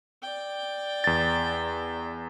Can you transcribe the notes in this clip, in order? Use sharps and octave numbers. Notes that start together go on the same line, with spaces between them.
D5 G5
E2 A6